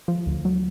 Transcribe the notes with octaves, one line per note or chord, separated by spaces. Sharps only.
F3
D2
F#3